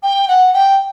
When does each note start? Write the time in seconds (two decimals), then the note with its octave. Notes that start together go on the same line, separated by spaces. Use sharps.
0.03 G5
0.28 F#5
0.53 G5